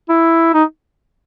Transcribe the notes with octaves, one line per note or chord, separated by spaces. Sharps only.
E4
D#4